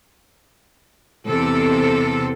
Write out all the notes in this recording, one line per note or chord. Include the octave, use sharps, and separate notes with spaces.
E2 C3 C4 A4